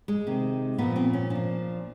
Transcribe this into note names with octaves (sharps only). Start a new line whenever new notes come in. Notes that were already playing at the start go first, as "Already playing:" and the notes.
G#3
C3 D#3
A#2 F3 B3
C4
C#4
F3 D4
A#2